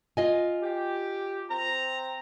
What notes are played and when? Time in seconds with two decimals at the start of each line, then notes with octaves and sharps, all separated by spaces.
0.17 F4 D#5 G#5
0.61 G4
1.49 C4 A#5